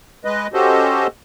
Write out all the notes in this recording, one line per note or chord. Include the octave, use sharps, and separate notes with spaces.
G#3 B4 D#5
C#4 F#4 G4 A4 C5 D#5